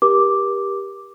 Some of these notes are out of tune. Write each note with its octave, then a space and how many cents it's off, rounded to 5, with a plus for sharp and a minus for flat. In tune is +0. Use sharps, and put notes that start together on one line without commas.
G4 +5 A#4 +35 D6 +0